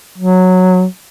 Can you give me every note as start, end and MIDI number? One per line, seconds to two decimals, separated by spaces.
0.18 0.84 54